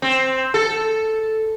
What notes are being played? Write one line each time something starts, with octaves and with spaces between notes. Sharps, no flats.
C4
A4